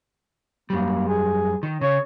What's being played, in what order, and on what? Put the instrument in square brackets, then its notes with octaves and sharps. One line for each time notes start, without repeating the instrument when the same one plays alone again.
[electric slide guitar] F#2 G3 [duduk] A#3
[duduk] G#4
[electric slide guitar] D#3
[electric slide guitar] C#3 [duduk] C#5